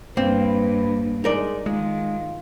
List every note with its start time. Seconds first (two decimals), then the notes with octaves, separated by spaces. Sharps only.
0.17 G2 A#3 C4 B4
1.24 G#3 D#4 A#4 D5
1.66 D#3 G#3 F4